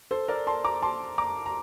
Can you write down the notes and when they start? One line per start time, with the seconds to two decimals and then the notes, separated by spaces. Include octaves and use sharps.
0.11 A4 C5
0.28 A#4 D5
0.47 A5 C6
0.65 A#5 D6
0.82 A5 C6
1.18 A#5 D6
1.46 A#5